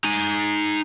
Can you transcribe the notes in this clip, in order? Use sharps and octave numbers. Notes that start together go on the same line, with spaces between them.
D#4 G#5